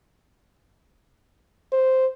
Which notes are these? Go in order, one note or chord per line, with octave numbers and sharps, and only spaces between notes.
C5